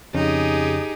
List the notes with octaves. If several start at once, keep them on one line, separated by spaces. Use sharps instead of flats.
F2 C#3 C#4 D#4 G4 G#4